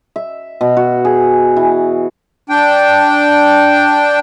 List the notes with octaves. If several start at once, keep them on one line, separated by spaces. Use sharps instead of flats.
E5
B2
F#4
G#4
E3
D4 G5